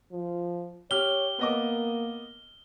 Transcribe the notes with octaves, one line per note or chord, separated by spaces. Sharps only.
F3
G4 C#5 F6 G7
A#3 B3 D#5 D6